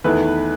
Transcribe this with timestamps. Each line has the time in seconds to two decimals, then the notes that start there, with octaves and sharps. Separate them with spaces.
0.04 E2 D#3 A3 E4 B4